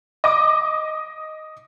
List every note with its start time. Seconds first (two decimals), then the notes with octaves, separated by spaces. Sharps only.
0.24 D#5 D6